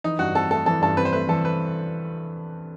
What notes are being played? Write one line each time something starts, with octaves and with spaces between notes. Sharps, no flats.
E3 D#4
G2 F#4
C4 A4
A3 A4
E3 A4
G2 A4
C4 B4
C5
A3 B4
E3 A4
B4